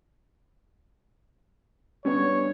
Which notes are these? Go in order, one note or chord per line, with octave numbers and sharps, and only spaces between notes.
G3 B3 C#4 D4 C#5